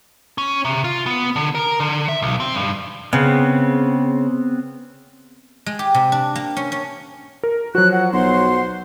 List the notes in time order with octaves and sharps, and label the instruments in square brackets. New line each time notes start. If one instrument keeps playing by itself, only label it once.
[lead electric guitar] C#4
C3
F4
B3
D3
A#4
D3
E5
B1
C4
G2
[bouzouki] C#3 [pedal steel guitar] B3 C4
[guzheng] G#3
G4
C3
D4
A#3
C#4
C#4
[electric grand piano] A#4
[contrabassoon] F3 [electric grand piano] F#3 F#4 [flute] F#6
[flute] F#5
[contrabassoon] B1 [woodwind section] C5 C6 [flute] F#5